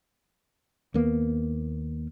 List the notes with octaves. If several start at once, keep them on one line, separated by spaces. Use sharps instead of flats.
D#2 A#3 B3